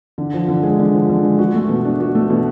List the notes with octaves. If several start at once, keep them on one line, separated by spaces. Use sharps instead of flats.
D3
F3
D3
G#3
D3
F3
D3
G#3
F#4
A3
B2
D4
F#4
A3
B2